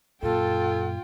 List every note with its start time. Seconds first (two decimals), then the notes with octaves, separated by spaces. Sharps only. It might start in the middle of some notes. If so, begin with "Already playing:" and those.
0.23 F#2 A#2 F4 A4 G5